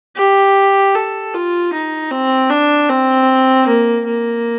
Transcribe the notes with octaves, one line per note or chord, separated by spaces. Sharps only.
G4
A4
F4
D#4
C4
D4
C4
A#3
A#3